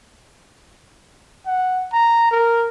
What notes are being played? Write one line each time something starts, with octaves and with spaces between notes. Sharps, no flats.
F#5
A#5
A#4